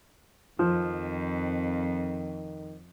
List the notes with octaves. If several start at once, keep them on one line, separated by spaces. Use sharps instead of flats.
F2 D#3 F3